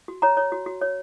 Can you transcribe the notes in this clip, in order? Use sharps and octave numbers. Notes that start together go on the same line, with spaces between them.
F#4
C#5 A#5
C#5
F#4
F#4
C#5